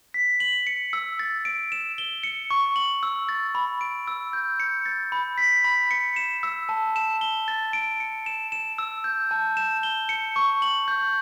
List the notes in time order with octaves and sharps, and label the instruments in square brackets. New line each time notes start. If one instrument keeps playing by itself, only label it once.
[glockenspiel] B6
F#7
C#7
E6
A6
D7
E7
G7
C#7
C#6
F#7
E6
A6
B5
D7
E6
G6
C#7
A6
B5
B6
B5
C#7
E7
E6
A5
E7
G7
A6
D7
C#7
E7
E7
E6
G6
A5
E7
G7
C#7
C#6
F#7
G6